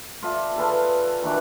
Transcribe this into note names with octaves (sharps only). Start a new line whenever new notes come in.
F4 A4 D5 E5
G#4 A4 B4 F5
D#3 E3 D4 F#4